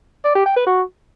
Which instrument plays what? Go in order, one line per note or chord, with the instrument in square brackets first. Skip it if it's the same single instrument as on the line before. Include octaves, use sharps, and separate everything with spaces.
[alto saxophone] D5
G4
G5
B4
F#4